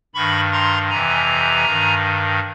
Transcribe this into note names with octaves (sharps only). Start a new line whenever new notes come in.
G2 D#3 B5 C#6
A#5 C6
F2 C3 E3 G#5 A#5
G2 D#3